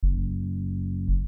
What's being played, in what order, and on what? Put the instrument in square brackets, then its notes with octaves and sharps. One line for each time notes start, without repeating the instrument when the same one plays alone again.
[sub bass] F#1